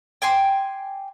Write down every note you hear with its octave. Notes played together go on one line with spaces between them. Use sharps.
G5 G#5 C6 D6